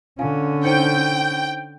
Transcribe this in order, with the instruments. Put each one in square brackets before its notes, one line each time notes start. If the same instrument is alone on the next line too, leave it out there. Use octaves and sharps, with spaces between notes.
[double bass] D3 C#4 [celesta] F4 F5 G#5
[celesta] D#4 C5 C#7 [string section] G5